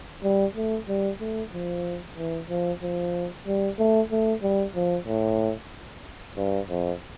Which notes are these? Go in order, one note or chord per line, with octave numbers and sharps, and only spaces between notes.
G3
A3
G3
A3
F3
E3
F3
F3
G3
A3
A3
G3
F3
A2
G2
F2